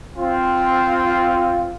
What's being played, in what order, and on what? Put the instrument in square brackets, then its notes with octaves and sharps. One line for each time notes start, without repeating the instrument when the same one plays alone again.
[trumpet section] C4 F4